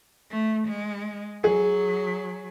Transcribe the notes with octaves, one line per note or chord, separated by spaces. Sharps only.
A3
G#3
F#3 G#4